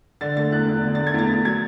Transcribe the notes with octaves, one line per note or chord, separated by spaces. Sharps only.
D3 A6
A3 A6
E2 F#6
E2
D3
A3 A6
G#6
E2 A6
E2
F#3 G#6